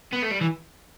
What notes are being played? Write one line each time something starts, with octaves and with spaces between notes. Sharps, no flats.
B3
A3
G3
E3